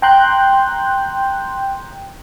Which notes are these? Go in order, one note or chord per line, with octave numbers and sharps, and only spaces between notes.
G5 A#5 C6 F#6 G6